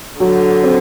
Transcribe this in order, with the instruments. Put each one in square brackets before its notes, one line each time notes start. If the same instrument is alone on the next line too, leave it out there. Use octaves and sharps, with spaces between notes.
[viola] D3 [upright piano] F#3
[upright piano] C4